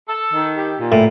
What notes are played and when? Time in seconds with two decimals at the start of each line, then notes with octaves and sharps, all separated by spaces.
0.09 A4
0.32 D#3
0.56 G4
0.79 A#2
0.92 A2